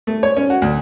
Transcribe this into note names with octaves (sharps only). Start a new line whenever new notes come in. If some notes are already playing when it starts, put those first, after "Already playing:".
A3
C#5
C#4
F#4
D2